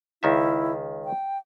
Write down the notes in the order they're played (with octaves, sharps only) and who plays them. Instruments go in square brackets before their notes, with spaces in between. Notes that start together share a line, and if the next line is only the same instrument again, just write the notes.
[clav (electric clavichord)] C#2 D#3 E5 [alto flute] E4
[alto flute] G5